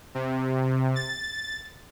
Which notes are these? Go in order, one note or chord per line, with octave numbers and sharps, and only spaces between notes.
C3
A6